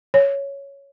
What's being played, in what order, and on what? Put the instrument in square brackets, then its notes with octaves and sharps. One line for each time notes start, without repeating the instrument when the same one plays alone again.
[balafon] C#5